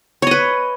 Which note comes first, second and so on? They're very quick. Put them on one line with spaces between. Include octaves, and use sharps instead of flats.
C#5 D#5 B4